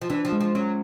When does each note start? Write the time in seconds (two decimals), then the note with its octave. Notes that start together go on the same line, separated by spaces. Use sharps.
0.01 F3
0.10 E3 D4
0.25 F3
0.32 G#3
0.40 F3
0.55 F#3 C#4